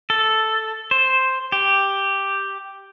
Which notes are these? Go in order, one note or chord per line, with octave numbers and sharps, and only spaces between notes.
A4
C5
G4